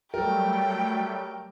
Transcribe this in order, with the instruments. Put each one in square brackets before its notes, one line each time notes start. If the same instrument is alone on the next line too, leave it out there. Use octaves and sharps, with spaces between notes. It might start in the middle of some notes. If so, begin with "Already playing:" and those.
[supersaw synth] F#3 G3 A3 [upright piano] A4 A#4 [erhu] G5